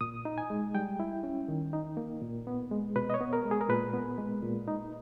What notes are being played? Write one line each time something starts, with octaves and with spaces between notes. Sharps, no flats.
A#2 D#6
D#4
G#5
G#3
G3 G5
E4
C#4
D#3
D#4
A#3
A#2
B3
G#3
B2 B4
D#5
C#5
B3
A#4
G#3
G#4
A#4
A#2 B4
B3
G#3
A#2
D#4